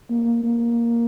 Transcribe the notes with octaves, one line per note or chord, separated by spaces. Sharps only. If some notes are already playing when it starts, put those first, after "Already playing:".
A#3
A#3